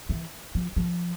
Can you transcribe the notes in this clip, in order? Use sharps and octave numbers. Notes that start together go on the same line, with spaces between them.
E3
F3
F3